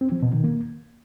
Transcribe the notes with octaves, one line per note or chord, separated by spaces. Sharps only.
C4
F3
B2
D#3
A#3